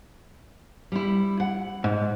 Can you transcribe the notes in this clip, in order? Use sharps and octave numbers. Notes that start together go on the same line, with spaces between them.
G3 E4
F#5
G#2